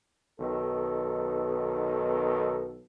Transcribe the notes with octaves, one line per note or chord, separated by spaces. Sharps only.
B1 D#3 B3 A4